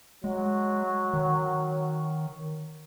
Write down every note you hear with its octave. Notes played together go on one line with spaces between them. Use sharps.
F#3 G#3
D#3